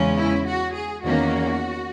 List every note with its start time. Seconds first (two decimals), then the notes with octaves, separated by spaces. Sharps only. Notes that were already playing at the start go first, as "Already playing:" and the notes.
Already playing: E2 C#3 G#3 C#4
0.17 E4
0.46 F#4
0.74 G#4
1.02 E2 D#3 A#3 C#4 F#4